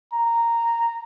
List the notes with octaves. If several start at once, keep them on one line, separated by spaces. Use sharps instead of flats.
A#5